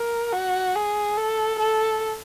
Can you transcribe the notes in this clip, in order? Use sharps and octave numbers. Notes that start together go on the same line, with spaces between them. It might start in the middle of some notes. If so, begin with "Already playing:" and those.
Already playing: A#4
F#4
G#4
A4
A4